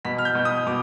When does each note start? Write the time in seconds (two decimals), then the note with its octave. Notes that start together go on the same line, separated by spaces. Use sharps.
0.05 B2 B6
0.18 F6
0.25 G6
0.35 B2
0.45 D#6
0.67 B2 D6